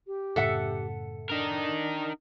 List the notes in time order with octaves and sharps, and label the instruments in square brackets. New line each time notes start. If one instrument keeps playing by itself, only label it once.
[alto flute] G4
[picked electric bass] F#2 A2 C#3 [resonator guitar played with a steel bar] A4 E5 F#5
[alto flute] D4 [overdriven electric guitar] D#4 A#4